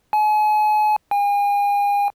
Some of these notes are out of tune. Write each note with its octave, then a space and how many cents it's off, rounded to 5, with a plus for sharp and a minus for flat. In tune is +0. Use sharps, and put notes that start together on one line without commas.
G#5 +40
G#5 -40